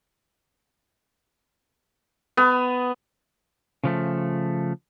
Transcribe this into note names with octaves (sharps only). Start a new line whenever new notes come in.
B3
C#3 F3 A3